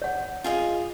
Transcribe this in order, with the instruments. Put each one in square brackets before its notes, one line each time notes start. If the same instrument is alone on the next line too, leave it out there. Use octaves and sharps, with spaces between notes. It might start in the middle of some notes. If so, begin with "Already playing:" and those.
[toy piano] C#5 F#5
[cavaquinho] F4 G#4 D#5